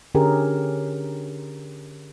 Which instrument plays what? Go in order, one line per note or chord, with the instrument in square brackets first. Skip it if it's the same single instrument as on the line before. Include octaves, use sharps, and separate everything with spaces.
[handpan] D3 C#4 G4 G#4 A#4